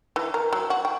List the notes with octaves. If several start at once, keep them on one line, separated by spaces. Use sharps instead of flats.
E3
A#4
F#3
F#4
G5